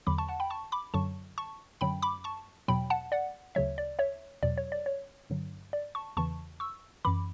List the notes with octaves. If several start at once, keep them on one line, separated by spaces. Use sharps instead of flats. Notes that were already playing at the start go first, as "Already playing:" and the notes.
E2 D3 F#3 B5 D6
A5 C#6
F#5 A5
G5 B5
A5 C#6
B5 D6
F#2 D3 F#3 A5 C#6
A5 C#6
F#2 D3 F#3 G5 B5
B5 D6
A5 C#6
E2 B2 F#3 G5 B5
F#5 A5
D5 F#5
D2 C#3 F#3 C#5 E5
D5
C#5 E5
E2 B2 F#3 D5
C#5
D5
C#5
G2 D3 F#3
D5
A5 C#6
E2 C#3 E3 A5 C#6
C#6 E6
F#2 E3 B5 D6